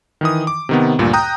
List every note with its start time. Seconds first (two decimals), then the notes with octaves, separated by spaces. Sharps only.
0.21 D#3 E3 D#6
0.47 D6
0.69 C3 D#3 B3
0.99 D2 G2 A#2
1.13 G5 A#5 D#6 F#6 G6